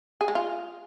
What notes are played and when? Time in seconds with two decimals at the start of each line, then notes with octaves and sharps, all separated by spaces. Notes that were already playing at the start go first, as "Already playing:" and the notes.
0.21 G#4
0.28 G#3
0.35 F4